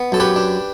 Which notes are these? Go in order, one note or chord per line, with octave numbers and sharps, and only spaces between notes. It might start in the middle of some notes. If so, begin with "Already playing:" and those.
Already playing: B3
F#2 A4
G4 B4
D4